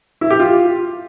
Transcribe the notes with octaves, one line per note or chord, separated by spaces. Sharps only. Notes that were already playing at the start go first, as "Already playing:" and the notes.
E4
G4
F4